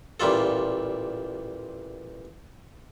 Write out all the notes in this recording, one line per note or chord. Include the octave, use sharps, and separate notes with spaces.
A1 A#2 G3 F4 A4